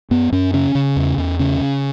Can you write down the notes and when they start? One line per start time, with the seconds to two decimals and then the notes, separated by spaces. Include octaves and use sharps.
0.11 F#2 B3
0.32 F#2 C#4
0.53 C#3 C#4
0.75 C#3
0.96 E2
1.18 E2
1.39 C#3 C#4
1.60 C#3